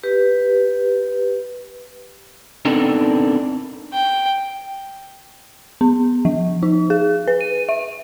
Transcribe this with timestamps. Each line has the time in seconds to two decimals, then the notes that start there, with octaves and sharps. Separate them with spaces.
0.03 G4 B4
2.65 B3 C4 D4 D#4 A4 A#4
3.93 G5
5.81 B3
6.25 F3
6.63 D#4
6.90 G#4
7.28 B4
7.41 D#7
7.69 E5